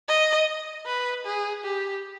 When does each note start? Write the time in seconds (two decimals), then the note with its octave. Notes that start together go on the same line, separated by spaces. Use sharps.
0.08 D#5
0.86 B4
1.25 G#4
1.64 G4